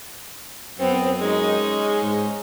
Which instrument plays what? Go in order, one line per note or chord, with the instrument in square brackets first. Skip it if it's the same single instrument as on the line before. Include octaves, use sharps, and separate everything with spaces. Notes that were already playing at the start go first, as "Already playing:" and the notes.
[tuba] F#2 [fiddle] B3 C4
[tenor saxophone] G#3 [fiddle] C#4 D#4
[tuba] G#2